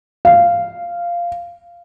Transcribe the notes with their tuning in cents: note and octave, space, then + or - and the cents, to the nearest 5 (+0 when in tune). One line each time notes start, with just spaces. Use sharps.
F5 -10